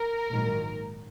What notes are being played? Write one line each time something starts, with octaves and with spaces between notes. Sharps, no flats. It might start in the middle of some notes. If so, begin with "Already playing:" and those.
Already playing: A#4
A#1 G#2 D#3 F#3 A#3